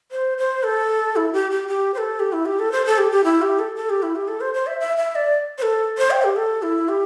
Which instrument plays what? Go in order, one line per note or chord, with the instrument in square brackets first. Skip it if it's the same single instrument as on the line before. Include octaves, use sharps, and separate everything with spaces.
[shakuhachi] C5
C5
A4
E4
G4
G4
G4
C5
A4
G4
E4
G4
A4
C5
A4
G4
G4
E4
G4
A4
A4
G4
E4
G4
A4
C5
C5
E5
E5
E5
D5
C5
A4
C5
G5
G4
A4
E4
G4